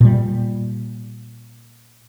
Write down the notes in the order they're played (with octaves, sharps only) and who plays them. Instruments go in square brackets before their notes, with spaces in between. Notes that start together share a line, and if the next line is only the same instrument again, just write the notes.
[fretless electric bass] A#2 G3